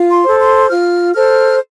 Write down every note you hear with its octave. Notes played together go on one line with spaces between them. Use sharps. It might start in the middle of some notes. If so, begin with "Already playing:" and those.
Already playing: F4
C6
A4 C5
C6
F4 F6
A4 C5 F6